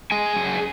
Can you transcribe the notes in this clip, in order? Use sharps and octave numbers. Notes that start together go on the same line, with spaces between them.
G#3 G#4 G#5
F#2